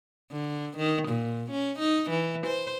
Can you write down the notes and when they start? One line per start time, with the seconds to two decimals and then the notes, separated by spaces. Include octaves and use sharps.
0.32 D3
0.77 D#3
1.08 A#2
1.51 C#4
1.79 D#4
2.10 E3
2.47 C5